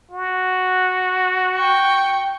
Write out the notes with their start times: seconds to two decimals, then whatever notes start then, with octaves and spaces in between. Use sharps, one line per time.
0.11 F#4
1.57 G5 C#6